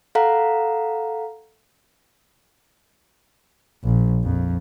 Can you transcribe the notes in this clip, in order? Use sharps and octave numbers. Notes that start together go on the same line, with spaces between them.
A4 F5 F#5 A#5
A#1
F2